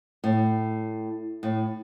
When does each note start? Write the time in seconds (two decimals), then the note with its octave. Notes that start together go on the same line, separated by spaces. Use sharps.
0.24 A2
1.43 A2